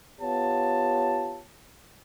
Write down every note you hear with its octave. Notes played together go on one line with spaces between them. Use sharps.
B3 F4 G4 C#5 A5